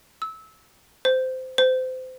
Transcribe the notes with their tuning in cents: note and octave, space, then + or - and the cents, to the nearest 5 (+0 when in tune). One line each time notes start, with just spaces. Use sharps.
E6 -20
C5 -20
C5 -30